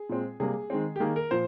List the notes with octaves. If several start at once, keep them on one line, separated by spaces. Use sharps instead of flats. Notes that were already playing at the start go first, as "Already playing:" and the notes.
Already playing: G#4
A#2 G#3 C4
C3 G3 A#3 G#4
D#3 G#3 C4
G4
D#3 A#3 G#4
A#4
A#2 F3 C5